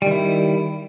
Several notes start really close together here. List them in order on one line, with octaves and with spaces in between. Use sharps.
G3 D#3 E4